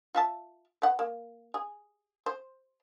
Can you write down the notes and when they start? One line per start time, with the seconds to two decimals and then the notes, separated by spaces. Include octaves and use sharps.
0.15 F4 E5 A5
0.82 B4 F#5
0.99 A#3
1.54 G#4
2.26 C5